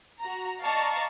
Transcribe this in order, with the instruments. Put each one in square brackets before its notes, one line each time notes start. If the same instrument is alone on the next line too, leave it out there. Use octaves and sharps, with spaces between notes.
[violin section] F#4 A#5
D5 D#5 F5 A5 A#5 C#6